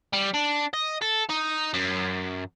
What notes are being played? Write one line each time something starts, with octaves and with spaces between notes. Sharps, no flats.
G3
D4
D#5
A4
D#4
F#2